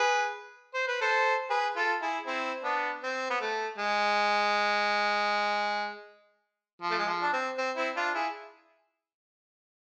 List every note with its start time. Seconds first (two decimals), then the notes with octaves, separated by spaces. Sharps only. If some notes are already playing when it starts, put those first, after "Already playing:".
Already playing: G#4 B4
0.74 C5
0.88 B4
1.01 A4 C5
1.50 G#4 B4
1.76 F4 A4
2.01 E4 G#4
2.26 C4 E4
2.64 B3 D4
3.03 C4
3.30 B3
3.41 A3
3.78 G#3
6.82 F3
6.90 A3
6.99 G#3
7.07 F3
7.22 D4
7.33 C4
7.58 C4
7.77 C4 E4
7.96 D4 F4
8.15 E4 G#4